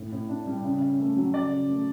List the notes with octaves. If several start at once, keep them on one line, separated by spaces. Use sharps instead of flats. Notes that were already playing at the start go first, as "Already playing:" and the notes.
Already playing: A2
A2
D4
G3
C#3
C#3
A3
F#3
C#3 D5
C#3
A3